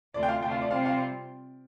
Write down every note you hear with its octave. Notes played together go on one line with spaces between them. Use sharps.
D2 C3 A3 F4 D5
G5
F5
D2 C3 A3 F4 G5
F5
D5
C3 G3 C4 F4 F5
F5